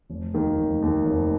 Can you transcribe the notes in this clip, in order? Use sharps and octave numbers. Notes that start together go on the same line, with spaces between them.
F1
D#2 D#3
F1
D#2 D#3
F1